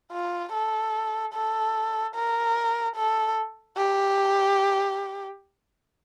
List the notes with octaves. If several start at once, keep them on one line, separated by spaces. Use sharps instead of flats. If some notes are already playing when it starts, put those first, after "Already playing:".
F4
A4
A4
A#4
A4
G4